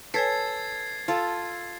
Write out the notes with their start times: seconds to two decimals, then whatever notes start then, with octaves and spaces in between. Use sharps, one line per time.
0.14 A4 B4 C#5 G#5 G#6 A6 C7
1.08 F4 A4